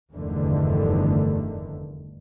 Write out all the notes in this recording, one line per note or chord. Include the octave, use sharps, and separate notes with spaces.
F1 E2 G2 D3 D#3 A3